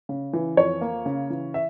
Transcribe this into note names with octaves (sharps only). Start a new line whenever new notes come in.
C#3
E3
F2 C#5
A#3
C#3
E3
E5